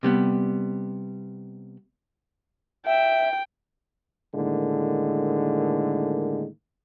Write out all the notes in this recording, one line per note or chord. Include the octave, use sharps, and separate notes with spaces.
C3 G3 B3
E5 G5
A2 D3 D#3 G#3 A#3